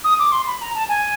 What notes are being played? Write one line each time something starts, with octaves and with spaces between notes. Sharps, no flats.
D#6
D6
C6
B5
A#5
A5
G#5